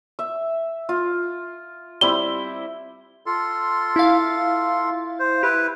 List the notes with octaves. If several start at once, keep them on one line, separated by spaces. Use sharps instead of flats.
E5
F4
G3 C4 E4 G7
F4 A4 C6
E4 F5
C5
E4 G4 B4